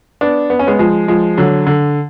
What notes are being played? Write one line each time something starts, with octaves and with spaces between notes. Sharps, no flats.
B3 D4
B3
C#4
G#3 B3
F3 G#3
F3 G#3
D3 F#3
D3